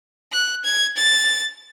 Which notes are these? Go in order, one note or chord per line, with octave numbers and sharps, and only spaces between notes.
F#6
G#6
A6